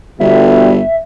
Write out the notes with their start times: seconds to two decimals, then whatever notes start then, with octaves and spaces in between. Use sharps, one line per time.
0.20 G1 B2 D3 G3 E5